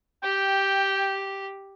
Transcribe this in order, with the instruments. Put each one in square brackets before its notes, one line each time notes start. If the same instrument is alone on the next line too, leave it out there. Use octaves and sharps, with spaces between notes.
[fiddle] G4 [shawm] G5